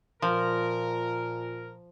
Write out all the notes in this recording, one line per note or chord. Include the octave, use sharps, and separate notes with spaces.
A#2 F3 A#4